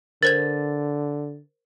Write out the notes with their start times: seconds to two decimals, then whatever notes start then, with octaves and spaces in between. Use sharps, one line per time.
0.23 D3 A#4 C5 G#6 A6